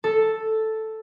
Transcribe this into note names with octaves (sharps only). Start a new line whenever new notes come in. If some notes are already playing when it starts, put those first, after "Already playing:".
A4